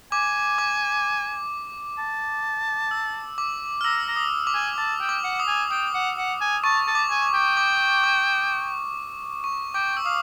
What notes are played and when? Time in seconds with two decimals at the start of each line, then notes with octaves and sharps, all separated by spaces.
0.12 G#5 D6
0.58 D6
1.98 A5
2.91 E6
3.38 D6
3.81 F6
3.85 A#5 E6
4.08 A#5
4.16 D#6
4.47 D6
4.55 G#5
4.78 A5 D6
5.01 G5
5.09 D6
5.24 F#5
5.40 D#6
5.48 G#5
5.71 G5 D#6
5.94 F#5
6.18 F#5
6.41 G#5
6.64 A5 C#6
6.87 A5
6.95 D6
7.10 G#5
7.34 G5
7.57 D6
8.04 D6
9.44 C#6
9.74 G5 D6
9.97 E6
10.05 F5 D#6